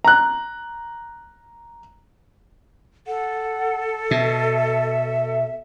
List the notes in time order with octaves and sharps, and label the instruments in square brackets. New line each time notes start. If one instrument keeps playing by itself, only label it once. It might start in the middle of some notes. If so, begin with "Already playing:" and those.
[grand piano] A#5 F#6
[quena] A4 [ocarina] F#5
[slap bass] B2 [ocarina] E5